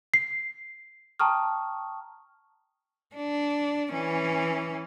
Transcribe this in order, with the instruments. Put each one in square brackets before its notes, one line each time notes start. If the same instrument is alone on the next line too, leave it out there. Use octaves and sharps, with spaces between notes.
[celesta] C7
G5 A5 A#5 C#6 D#6 F6
[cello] D4
E3 C#4